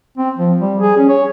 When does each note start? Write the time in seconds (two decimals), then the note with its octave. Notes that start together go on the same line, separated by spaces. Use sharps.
0.18 C4
0.38 F3
0.60 G3
0.80 G#4
0.97 C#4
1.09 C#5